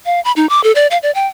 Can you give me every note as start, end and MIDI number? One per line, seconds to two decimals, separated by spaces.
0.06 0.20 77
0.25 0.32 83
0.36 0.48 63
0.49 0.63 86
0.64 0.72 69
0.75 0.87 74
0.91 0.98 77
1.03 1.11 74
1.15 1.27 79